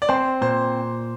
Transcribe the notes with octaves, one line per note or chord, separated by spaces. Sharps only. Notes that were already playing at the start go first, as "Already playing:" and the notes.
D5
C4 C5
A#2 C5